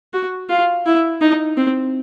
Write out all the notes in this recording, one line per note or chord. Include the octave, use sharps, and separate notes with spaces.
F#4
F4
E4
D#4
C4